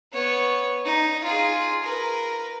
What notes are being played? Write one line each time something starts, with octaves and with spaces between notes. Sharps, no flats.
B3 C#5
D#4
F4 G#4
A#4 B4